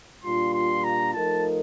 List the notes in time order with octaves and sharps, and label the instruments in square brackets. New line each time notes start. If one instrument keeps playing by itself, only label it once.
[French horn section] A#2 G3 D4 F4 [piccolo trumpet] C6
[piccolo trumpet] C6
A#5
[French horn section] F3 A3 D#4 A#4 [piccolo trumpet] A5